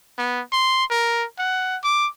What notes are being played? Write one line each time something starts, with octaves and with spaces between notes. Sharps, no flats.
B3
C6
A#4
F#5
D6